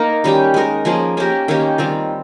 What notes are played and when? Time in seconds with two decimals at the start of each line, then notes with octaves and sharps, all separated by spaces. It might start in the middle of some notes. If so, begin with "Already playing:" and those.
Already playing: A#3 D#4 A#4
0.24 D#3 G3 C#4 G4
0.54 G#3 D#4 A#4
0.85 F3 A#3 C#4 G#4
1.17 A#3 C#4 G4 A#4
1.48 D#3 A#3 C#4 G4
1.78 D#3 G3 C4 F4